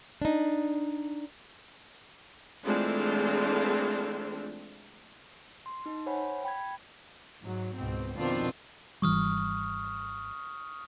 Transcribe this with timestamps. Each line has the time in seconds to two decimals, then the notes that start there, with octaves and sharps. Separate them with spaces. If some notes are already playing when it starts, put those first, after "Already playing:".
0.22 D4 D#4
2.64 E3 G#3 A3 C4 D4 F4
5.66 C6
5.86 D#4
6.06 C5 C#5 F#5 G#5 B5
6.44 G5 B5 G#6
7.44 G#2 F#3
7.75 C#2 G#2 B2 C4
8.17 F2 B2 D#3 C4 D4 F4
9.02 G#1 E3 G3 C#6 D#6 F6